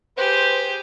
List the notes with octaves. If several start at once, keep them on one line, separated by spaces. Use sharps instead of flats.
G4 G#4 B4 C5